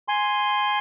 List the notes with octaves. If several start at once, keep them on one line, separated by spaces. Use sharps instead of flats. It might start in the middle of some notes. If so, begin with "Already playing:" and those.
G#5 C6